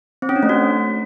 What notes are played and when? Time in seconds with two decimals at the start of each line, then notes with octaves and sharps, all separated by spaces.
0.22 C4
0.29 C#4
0.36 D4
0.43 A3
0.49 F#4